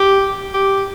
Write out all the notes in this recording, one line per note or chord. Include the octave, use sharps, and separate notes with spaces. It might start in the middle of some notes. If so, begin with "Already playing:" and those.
Already playing: G4
G4